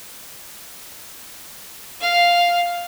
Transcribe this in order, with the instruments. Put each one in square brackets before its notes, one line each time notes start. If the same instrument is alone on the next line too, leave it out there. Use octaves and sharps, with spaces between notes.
[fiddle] F5